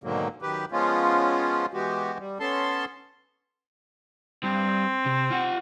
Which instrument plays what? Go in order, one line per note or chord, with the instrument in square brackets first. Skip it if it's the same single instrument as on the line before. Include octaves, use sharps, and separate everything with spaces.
[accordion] G#2 B2 D3 D#3 F#3 A#3
F#2 D#3 G4 B4
F3 G#3 B3 C#4 F4
E3 G#3 B3 F#4 G4
G3
B3 C#4 A4 A5 C6
[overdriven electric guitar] G2 [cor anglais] C4
[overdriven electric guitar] C3
F4 F#5